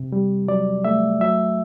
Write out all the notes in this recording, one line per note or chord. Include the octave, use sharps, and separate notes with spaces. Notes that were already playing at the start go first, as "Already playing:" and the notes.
Already playing: C3
G3
F#3 D5
A3 E5
F#3 E5